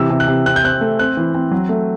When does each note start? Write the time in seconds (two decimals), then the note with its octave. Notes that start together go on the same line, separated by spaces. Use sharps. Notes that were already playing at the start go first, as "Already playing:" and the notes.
Already playing: C3 E3 E6
0.10 C3
0.20 F#6
0.28 C3
0.46 C4 F#6
0.56 G6
0.64 C4 F#6
0.81 A3
0.99 C4 F#6
1.17 E3
1.34 C4
1.51 F#3
1.69 A3